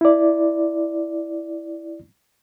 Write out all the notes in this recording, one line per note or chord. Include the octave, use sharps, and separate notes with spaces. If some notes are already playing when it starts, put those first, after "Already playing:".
E4 D5